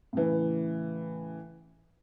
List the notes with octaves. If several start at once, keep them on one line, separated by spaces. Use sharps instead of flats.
A2 C#3 E3